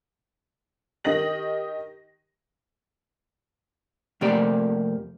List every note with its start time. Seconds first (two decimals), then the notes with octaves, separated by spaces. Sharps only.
1.04 D#3 G4 D#5 A#6 F#7
4.21 F2 C3 A3 A#3 G4 D5